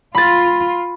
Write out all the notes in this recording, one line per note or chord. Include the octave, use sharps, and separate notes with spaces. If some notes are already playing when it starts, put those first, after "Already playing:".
F4 B5 A6